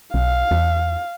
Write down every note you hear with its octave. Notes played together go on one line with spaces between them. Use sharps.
B1 F5
E2